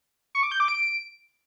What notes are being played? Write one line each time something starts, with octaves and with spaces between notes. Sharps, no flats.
C#6
D6
G6
D6
D7